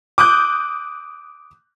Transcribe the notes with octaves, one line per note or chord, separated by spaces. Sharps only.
D6 D#6 F#6 G6